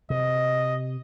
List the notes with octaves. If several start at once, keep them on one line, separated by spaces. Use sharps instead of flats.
C3 D#5